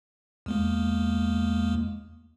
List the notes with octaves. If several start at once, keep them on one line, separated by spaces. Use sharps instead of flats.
E2 G#3 A#3